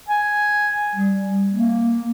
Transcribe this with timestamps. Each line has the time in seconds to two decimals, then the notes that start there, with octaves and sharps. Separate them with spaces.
0.09 G#5
0.95 G3
1.52 A#3